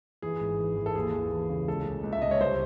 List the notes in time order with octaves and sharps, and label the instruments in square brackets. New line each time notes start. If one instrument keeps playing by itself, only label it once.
[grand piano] E3 G#4
G#1
E3
E3
A4
D#2 G#4
E3
E3
C#3
C#2 A4
C#2
C#2
E5
C#2 D#5
C#5
C2 C5